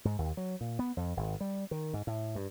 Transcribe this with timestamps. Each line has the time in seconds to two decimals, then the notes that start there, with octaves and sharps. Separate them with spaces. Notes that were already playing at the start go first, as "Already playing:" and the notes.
0.05 G#2
0.18 D#2
0.37 F#3
0.61 A#2
0.79 B3
0.97 F2
1.17 G#1
1.41 G3
1.71 D#3
1.94 G#2
2.07 A2
2.35 G2